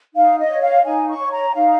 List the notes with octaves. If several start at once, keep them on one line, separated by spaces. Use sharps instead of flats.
D#4 F5
D#5
C#5
F5
D#4 G#5
C#6
C#5
A#5
D#4 F5